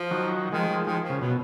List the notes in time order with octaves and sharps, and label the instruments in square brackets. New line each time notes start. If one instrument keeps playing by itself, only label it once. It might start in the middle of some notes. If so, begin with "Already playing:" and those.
Already playing: [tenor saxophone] F3
[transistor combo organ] D#3 F#3
[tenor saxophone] D#3 [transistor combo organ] F3 G#3
[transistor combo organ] F3 G#3
[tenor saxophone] D#3 [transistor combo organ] F3 G#3
[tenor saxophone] F3
[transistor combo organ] C#3
[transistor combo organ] B2 [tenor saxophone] F#3